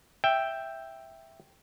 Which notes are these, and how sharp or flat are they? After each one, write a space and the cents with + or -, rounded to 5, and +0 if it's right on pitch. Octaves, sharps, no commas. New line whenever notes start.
E5 +0 G5 +0